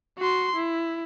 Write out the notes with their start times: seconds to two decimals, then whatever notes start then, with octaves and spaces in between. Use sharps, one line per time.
0.18 F#4 C6
0.56 E4